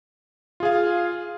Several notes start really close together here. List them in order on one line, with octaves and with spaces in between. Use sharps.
F4 G#4 F5